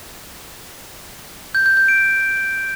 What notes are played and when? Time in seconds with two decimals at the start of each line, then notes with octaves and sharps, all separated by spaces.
1.55 G6
1.66 G6
1.77 G6
1.88 D7